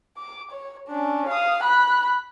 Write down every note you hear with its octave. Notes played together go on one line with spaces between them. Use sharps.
D6
C#5
C#4 D4
F5 D#6
B5 F#6